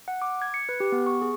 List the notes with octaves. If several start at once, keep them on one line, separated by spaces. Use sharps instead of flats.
F#5
D6
G#6
C#7
B4
G4
B3
C#6
G#4